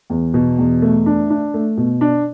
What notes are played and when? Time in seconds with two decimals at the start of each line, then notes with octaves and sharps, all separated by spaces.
0.10 E2
0.34 B2
0.59 E2
0.82 A3
1.06 D4
1.30 D4
1.54 A3
1.78 B2
2.01 D4